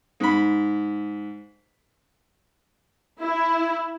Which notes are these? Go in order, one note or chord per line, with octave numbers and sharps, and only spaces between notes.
G#2 B5
E4